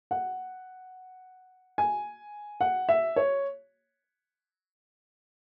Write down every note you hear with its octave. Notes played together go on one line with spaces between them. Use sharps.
F#5
G#5
F#5
E5
C#5